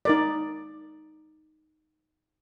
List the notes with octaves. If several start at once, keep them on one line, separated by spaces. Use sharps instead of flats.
D#4 A#4 D5